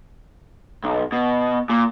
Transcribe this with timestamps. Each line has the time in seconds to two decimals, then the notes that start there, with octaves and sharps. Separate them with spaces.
0.84 B1
1.12 B2
1.70 A#2